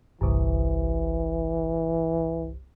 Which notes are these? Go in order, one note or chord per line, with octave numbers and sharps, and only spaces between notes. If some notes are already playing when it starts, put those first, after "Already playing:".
G1 C2 E3